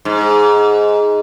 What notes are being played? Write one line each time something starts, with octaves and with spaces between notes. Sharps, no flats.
G#2